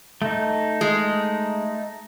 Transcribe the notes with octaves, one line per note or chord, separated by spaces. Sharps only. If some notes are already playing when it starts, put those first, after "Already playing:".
A3 D#4
G#3